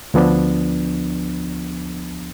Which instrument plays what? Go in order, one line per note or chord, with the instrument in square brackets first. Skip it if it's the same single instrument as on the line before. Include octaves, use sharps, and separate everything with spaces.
[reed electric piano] D2 F3 B3 D4